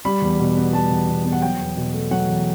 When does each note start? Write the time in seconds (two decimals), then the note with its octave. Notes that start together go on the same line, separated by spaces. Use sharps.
0.05 G3 B5
0.21 E2
0.40 B2
0.56 B3
0.73 G3 A5
0.91 E2
1.08 B2
1.25 B3
1.33 F#5
1.42 F#3 G5
1.60 E2
1.77 B2
1.94 A3
2.11 F#3 F#5
2.28 E2